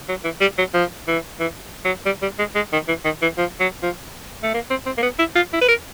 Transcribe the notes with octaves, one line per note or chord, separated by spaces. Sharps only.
F#3
E3
G3
F#3
F3
E3
E3
F#3
G3
G3
G#3
G#3
D#3
E3
D#3
E3
F3
F#3
F3
A3
A#3
C4
C4
A#3
B3
E4
F4
E4
B4
A#4